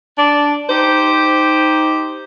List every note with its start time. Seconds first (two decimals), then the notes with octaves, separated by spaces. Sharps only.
0.18 D4 D5
0.69 D#4 G4 C5